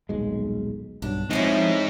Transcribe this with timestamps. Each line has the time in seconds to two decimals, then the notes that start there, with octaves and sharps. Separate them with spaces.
0.09 D#1 B1 G#3
1.02 B1 G2 F#3 D4
1.31 F3 G#3 A3 C4 C#4 D#4 E4